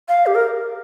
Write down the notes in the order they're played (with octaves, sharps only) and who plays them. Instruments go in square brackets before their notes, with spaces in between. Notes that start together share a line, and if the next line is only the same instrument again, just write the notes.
[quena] F5
G4
A#4